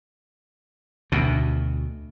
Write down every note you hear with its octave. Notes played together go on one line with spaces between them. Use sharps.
D2 B2